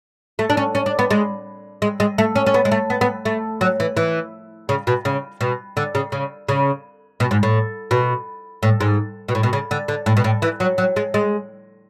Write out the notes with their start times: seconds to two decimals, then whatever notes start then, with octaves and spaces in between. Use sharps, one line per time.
0.39 A3
0.50 D4
0.57 C#4
0.75 C#4
0.86 D4
0.99 B3
1.11 G#3
1.82 G#3
2.00 G#3
2.18 A3
2.36 C#4
2.46 C#4
2.54 B3
2.65 G#3
2.71 A3
2.90 B3
3.01 B3
3.25 A3
3.61 F#3
3.80 E3
3.97 E3
4.69 C#3
4.87 B2
5.05 C#3
5.41 B2
5.77 D3
5.95 C#3
6.12 C#3
6.49 C#3
7.20 B2
7.31 G#2
7.43 A2
7.91 B2
8.63 A2
8.80 G#2
9.28 B2
9.35 A2
9.43 B2
9.53 C#3
9.71 D3
9.88 D3
10.06 A2
10.17 B2
10.24 A2
10.42 E3
10.60 F#3
10.78 F#3
10.96 G#3
11.14 G#3